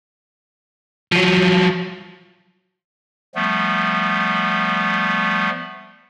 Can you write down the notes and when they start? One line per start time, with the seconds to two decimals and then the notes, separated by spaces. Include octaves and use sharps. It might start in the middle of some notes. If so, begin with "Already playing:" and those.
1.12 F3 F#3
3.35 F3 G3 A3 B3